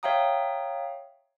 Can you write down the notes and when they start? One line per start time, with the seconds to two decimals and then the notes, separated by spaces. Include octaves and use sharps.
0.03 C#5 E5 F5 G5 A#5 D#6